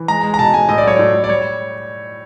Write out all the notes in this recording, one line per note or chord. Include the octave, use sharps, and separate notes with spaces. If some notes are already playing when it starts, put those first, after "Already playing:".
Already playing: E3
G#3 A#5
G#3
A#5
B2 A5
G#3 G#5
A2 D#5
D5
F#3 C#5
A2 D5
A2
D5
G3 C#5